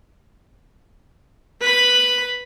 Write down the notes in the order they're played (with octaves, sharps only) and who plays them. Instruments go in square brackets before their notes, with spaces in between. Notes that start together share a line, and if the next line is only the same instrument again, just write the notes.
[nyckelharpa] B4 B5